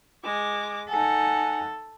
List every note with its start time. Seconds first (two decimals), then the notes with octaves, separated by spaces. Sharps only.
0.24 G#3 D6
0.90 D#4 A4 F#5 G#5